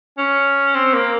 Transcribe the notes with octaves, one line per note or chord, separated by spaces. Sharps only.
C#4
C4
A#3